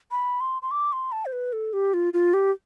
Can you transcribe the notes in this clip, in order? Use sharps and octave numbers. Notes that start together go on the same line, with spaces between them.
B5
C6
C6
D6
C6
A5
C5
B4
A4
G4
F4
F4
G4